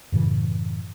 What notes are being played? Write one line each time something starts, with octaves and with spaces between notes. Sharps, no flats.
F#2 A2 C#3 E3